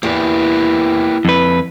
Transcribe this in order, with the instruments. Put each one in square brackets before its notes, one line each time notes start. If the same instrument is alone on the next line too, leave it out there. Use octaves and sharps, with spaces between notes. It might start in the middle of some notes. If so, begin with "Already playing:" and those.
[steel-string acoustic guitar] E2 [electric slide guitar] A#3 G4 B4
[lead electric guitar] F2 B4